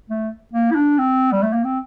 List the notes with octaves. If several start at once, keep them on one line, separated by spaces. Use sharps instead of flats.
A3
A#3
E4
D4
C4
G3
A3
A#3
C4